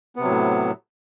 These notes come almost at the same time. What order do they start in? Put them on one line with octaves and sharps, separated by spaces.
B3 C3 F#3 A2